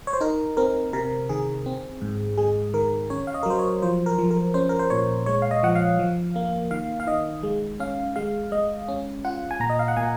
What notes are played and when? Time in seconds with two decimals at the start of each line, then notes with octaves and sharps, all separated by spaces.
0.07 C#5
0.13 C5
0.21 D#4 A#4
0.57 C4 A#4
0.93 C3 A#4
1.29 D#3 G#4
1.66 C4
2.02 G#2
2.37 G#3 G#4
2.74 D#3 A#4
3.10 C#4 C#5
3.27 F5
3.34 D#5
3.43 A#4
3.46 F#3 C5
3.59 C#5
3.82 F3 C5
4.06 A#4
4.18 F3
4.31 A#4
4.54 C#4 C5
4.69 A#4
4.79 C5
4.90 A#2 C#5
5.26 G#3 C#5
5.42 F5
5.51 D#5
5.63 F3 F#5
5.75 F5
5.99 F3
6.36 A#3
6.71 D#3 F5
7.00 F5
7.07 D#3 D#5
7.43 G#3
7.80 C#4 F5
8.16 G#3 F5
8.52 G#3 D#5
8.88 C#4
9.25 F4 F#5
9.51 G#5
9.60 A#2 A#5
9.70 D#5
9.79 F5
9.88 F#5
9.97 A#2 G#5